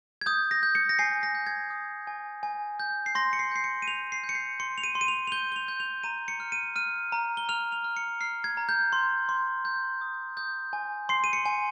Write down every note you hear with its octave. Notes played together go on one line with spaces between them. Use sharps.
G#6
D#6 G6
A#6
G6
C#7
A#6
G#5 C7
A#6
G6
G#6
D#6
G#5
G#5
G6
C7
C6 A#6
C#7
C7
G6 C7
C#7
D#7
G6 F7
C7
G6
C#7
C7
C6 C#7
F7
D#7
C6
D#7
F7
F7
G6 G7
G7
F7
G6
F7
A#5 D#7
C#7
F6
D#7
F6 D#7
A#5
G7
F6 F7
F7
F6
C#7
F6 C7
G#6
A#5
G6
C6
C6
G6
D#6
D#6 G6
G#5
C6 C7
D#7
C#7
G#5